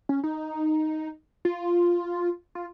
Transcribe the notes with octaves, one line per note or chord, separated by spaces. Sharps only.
C#4
D#4
F4
F4